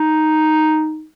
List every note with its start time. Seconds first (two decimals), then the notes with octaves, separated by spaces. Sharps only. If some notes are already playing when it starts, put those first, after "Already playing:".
Already playing: D#4